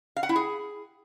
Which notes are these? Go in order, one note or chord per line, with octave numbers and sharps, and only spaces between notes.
F5
F#5
E4
G#4